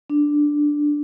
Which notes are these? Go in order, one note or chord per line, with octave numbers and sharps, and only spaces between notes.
D4